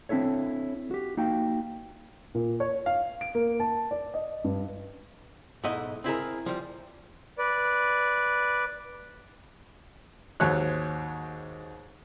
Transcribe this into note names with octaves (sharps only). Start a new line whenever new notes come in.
C4 D4 E4 A4 C#5
F#4 G4
A#3 D#4 F#4 G5
A#2
C#5
F5
D7
A#3
A5
D5
D#5
G2
B1 G#2 A3 E4 D#5 F#5
C4 E4 G#4 A#4
F3 G3
B4 D5
D#2 G#2 F#3 C#5 F#6